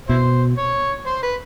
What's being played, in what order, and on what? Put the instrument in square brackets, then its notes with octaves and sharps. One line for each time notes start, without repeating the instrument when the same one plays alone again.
[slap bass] B2 [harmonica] E4 C5
[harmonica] C#5
C5
B4